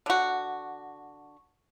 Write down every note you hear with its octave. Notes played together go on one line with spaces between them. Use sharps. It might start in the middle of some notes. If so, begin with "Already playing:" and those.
D3 F#4